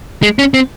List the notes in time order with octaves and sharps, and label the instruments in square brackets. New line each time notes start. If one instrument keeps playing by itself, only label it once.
[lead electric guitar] G#3
C#4
C4